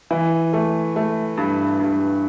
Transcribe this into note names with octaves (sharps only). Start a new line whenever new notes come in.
E3
A3
A3
G2
G2